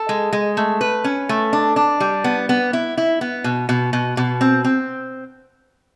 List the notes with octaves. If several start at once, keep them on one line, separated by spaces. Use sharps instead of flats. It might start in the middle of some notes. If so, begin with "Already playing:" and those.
Already playing: A4
G#3
G#3
A3
B4
C#4
A3
D4
D4
G3
B3
B3
E4
E4
B3
B2
B2
B2
B2
C4
C4